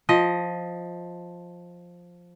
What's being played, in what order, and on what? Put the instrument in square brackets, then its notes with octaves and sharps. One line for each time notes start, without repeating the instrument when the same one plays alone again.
[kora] F3 D#5